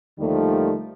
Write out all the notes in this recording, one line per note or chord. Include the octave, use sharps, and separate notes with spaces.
D#2 D3 D#3 F3 G3 A3